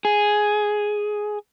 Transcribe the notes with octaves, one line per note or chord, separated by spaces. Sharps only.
G#4